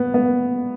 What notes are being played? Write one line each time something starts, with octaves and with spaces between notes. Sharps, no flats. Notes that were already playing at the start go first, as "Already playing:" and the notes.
Already playing: B3
B3